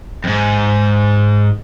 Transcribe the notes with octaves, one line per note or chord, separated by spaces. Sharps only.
F2 G#2